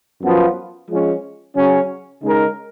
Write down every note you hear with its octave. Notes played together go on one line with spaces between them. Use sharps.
F#2 F3 B3 F4
F3 G#3 C#4
C#3 F#3 C#4
C#3 G#3 D#4 A#4